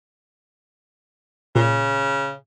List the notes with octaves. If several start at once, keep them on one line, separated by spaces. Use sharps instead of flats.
A#2 C#3